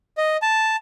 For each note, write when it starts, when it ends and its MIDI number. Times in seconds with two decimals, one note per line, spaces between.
0.18 0.37 75
0.42 0.76 81